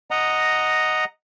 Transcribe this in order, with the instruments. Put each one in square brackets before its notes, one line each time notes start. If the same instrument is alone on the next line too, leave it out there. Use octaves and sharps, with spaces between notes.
[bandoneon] D#5 F#5 A#5